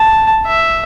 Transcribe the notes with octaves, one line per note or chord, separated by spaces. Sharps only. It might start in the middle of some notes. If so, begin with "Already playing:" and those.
Already playing: A5
E5